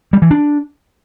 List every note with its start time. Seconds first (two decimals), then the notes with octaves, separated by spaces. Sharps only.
0.13 G3
0.22 E3
0.31 D4